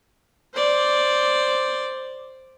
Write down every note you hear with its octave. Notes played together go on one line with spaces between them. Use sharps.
C5 D5